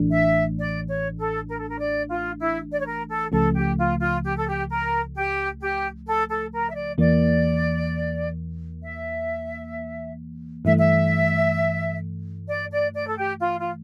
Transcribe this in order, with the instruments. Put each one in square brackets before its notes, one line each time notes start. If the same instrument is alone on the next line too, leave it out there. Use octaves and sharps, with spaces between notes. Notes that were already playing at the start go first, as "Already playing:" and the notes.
Already playing: [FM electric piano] A1 A2 E3 A3 D4
[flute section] E5
D5
C#5
A4
A#4
A4
A#4
D5
F4
E4
D5
C#5
A#4
A4
[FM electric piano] C#2 C#3 F3 A3 [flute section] A4
[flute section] G4
F4
F4
G4
A4
G4
A#4
G4
G4
A4
A4
A#4
E5
D5
[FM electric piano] E2 E3 A#3 [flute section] D5
[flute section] E5
[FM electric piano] G2 E3 A3 [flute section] E5
[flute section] E5
D5
D5
D5
A4
G4
F4
F4